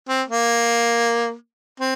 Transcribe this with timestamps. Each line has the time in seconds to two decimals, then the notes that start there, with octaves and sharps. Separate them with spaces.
0.09 C4
0.28 A#3
1.80 C4